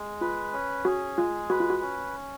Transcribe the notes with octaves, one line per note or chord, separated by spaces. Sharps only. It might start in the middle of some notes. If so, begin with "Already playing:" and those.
Already playing: G#3
F4 B4
C#4
F#4 G#4
G#3 F4
F#4 B4
F4
F#4
C#4